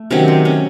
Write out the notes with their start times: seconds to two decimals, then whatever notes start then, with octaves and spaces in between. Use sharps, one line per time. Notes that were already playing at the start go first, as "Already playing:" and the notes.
Already playing: A3
0.11 C3 D#3 F#3 C#4
0.28 C4
0.45 C#4